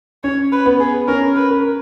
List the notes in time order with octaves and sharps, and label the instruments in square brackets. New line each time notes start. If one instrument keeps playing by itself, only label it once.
[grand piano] C#4 [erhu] C#5
[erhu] B4
[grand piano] B3
[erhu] G#4
[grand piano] C#4 [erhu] A#4
[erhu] B4
[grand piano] A#4